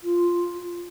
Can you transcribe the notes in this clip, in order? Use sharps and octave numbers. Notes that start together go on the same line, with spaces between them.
F4